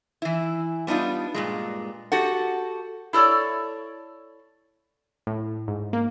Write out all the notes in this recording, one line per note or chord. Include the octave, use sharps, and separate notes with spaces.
E3 E4
G3 B3 D4 D#4 F4
G2 A#2 G#3
F#4 G4 A4 F#5
E4 A4 A#4 C#5 D5
A2
G#2
A#3